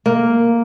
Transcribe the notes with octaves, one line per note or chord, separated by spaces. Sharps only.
A#3